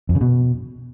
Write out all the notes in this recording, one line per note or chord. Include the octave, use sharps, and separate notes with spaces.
F2
C#3
B2